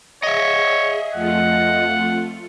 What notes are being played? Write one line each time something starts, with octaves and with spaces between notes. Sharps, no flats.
G#4 C#5 D#5 E5
F2 A3 F4 F#5